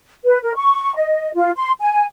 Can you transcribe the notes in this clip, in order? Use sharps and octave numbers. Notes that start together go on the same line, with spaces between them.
B4
A#4
C#6
D#5
F4
C6
G#5